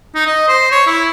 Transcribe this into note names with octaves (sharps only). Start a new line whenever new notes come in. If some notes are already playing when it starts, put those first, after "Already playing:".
D#4
D#5
C5
C#5
E4